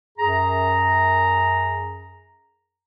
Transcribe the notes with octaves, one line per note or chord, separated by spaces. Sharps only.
F#2 G#4 A#5